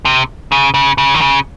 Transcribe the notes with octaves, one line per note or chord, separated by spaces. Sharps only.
C3
C#3
C#3
C#3
D#3
C#3